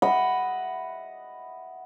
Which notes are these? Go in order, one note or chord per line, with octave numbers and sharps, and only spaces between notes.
D#5 E5 F#5 B5